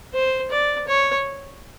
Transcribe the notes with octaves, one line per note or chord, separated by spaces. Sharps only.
C5
D5
C#5